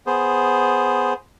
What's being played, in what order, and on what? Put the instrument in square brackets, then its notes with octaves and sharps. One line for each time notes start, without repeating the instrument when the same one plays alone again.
[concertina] B3 G#4 C5